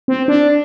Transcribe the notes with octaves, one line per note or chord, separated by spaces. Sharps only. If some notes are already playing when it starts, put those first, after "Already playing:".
C4
D4